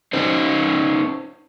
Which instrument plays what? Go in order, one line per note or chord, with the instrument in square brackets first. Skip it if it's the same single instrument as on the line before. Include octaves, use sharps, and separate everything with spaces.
[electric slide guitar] C#4 D#4 C5